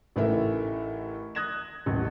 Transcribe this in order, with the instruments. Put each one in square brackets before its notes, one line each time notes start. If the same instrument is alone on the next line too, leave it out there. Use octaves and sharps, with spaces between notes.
[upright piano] A1 A2 E3 D#4 A#4 E5
D#6 F#6 G#6 A#6 E7
D#1 A1